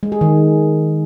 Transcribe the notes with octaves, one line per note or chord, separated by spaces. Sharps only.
G#3
G#4
D#3